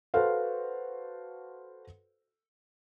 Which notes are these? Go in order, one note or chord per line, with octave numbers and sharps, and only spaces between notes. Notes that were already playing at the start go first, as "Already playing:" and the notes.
F#4 A4 B4 C5 F5